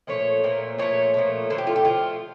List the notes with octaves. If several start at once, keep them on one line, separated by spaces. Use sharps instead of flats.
A#2 F3 A3 C#5
A#2 F3 A3
A#2 F3 A3 C#5
A#2 F3 A3
D3 F3 A3 A4
G4
F4
G4
D3 F3 A3 F4